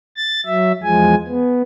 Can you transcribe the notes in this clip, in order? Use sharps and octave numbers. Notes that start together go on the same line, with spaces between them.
A6
F#3 E5
E2 F3 G#3 G#5
B3